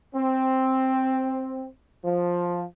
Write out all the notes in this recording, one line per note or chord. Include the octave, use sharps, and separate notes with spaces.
C4
F3